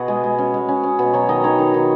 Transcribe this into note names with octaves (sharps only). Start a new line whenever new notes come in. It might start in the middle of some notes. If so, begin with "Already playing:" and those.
Already playing: B2 F#4 G#4 D#5
G#3
G#3
C#4
G#3
C#4
C#4
B2
F#3 C#5
D#3 D#5
D#3 C#5
D#3
D#3